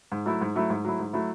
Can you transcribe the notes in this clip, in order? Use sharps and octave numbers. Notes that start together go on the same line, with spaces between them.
G#2
F#3 A3 E4
G#2
F#3 A3 E4
G#2
F#3 A3 E4
G#2
F#3 A3 E4